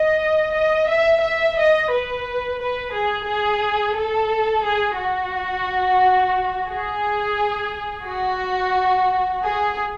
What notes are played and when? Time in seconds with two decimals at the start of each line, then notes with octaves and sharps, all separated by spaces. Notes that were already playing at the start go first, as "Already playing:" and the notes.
Already playing: D#5
0.53 D#5
0.88 E5
1.22 E5
1.57 D#5
1.91 B4
2.60 B4
2.93 G#4
3.27 G#4
3.96 A4
4.64 G#4
4.99 F#4
6.69 G#4
8.06 F#4
9.43 G#4